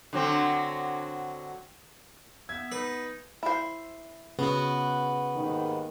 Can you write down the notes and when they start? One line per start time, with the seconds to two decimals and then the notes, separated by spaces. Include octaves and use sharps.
0.13 D3 F#3 C4
2.49 B3 E5 G#6
2.72 D#4 B4
3.43 E4 C5
4.39 C#3 B3 F#4
5.36 D#2 G#2 D#3